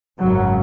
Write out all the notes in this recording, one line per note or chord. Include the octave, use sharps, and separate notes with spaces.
G#1 F#2 C#3 F#3